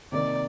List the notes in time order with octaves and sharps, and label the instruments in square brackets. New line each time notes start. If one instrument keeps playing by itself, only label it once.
[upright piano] C3 D#3 A#3 [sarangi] D5